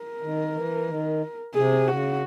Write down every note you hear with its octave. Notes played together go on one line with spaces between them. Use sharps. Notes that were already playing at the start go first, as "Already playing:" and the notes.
Already playing: A#4
D#3
E3
D#3
C3 G#4
C#3 F#4